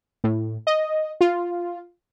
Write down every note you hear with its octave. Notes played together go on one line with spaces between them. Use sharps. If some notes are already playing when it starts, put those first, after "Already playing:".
A2
D#5
F4